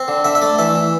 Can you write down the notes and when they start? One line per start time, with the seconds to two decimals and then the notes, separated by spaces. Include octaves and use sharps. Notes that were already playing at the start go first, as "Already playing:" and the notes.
Already playing: C4
0.08 D3
0.24 D3 E5
0.35 E5
0.42 A3 D5
0.59 E3 E5
0.75 E3